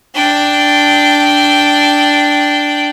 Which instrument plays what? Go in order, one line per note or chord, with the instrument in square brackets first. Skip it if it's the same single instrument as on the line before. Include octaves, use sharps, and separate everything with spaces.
[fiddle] D4 G5